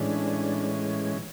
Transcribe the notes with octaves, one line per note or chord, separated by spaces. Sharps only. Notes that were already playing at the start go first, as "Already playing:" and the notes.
Already playing: A2 E3 G#3 C#4 D4